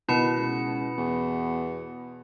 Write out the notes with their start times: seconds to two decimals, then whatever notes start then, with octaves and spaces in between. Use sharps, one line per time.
0.09 B2 D#3 E4 B5 C#7
0.36 C#2
0.97 E2